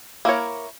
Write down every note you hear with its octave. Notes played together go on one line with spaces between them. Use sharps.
A#3 E4 A#4 C#5